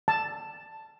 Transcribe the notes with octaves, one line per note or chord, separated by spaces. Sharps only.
A5